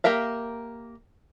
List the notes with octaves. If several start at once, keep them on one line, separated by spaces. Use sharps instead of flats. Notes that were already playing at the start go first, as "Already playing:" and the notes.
A#3 G4 A#4 E5 F5